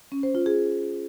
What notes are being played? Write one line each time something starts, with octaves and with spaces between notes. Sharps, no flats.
C#4
C5
F4
G#4